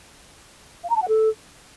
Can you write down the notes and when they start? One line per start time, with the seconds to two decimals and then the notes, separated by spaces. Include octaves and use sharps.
0.84 F5
0.90 A#5
0.96 A5
1.02 F#5
1.08 A4